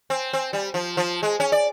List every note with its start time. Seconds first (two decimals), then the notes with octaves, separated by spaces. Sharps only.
0.10 C4
0.33 C4
0.53 G3
0.74 F3
0.97 F3
1.23 G#3
1.40 C#4
1.52 D5